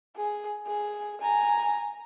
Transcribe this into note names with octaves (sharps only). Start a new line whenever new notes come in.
G#4
G#4
G#5 A#5